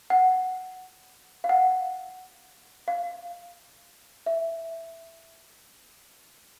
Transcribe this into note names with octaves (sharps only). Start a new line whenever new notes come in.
F#5
F5
F#5
F5
E5